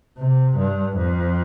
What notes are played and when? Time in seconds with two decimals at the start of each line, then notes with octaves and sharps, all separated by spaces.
0.18 C3
0.57 G2
0.97 F2